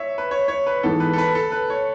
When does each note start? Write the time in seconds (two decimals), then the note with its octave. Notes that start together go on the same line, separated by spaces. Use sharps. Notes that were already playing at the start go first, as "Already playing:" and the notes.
Already playing: C#5 E5
0.18 B4
0.31 C#5
0.48 C#5
0.67 B4
0.83 G#2 E3 B3 A4
1.00 B4
1.13 A4
1.18 B4
1.35 A4
1.52 B4
1.70 C#5